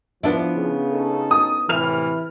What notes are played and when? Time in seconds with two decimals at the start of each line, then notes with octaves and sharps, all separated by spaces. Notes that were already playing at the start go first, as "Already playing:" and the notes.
0.23 F3 B3 D4 E4
0.56 C#3
0.93 C#4 D#4 A4
1.31 D#6
1.69 A2 C3 E3 F6 F7